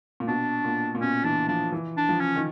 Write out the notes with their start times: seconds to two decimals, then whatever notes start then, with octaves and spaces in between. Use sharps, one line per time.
0.20 A#2
0.28 B2 D4
0.65 A#2
0.95 A#2
1.01 B2 C#4
1.24 E3 D4
1.48 F3 D4
1.72 E3
1.97 D4
2.09 F3
2.20 C#4
2.36 D#3